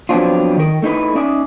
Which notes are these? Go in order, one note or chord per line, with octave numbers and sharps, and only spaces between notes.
F3 F#3 B3 C4 D4 F4
D#3 A#4
A3 D#4 E4 B4
C#4 D#4 D5 E5